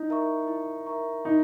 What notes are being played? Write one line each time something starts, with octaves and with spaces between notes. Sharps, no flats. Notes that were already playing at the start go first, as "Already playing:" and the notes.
Already playing: D#4 E4
A#4 E5 A#5 C#6
E4
A#4 E5 A#5 C#6
D#4 E4